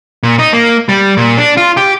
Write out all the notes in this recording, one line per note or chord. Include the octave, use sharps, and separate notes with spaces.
A#2
D#4
A#3
G3
A#2
D4
F4
G4